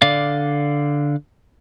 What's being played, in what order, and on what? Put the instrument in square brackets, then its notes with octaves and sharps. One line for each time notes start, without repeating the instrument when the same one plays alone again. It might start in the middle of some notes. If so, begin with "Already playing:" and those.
[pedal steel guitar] D3 D5 F5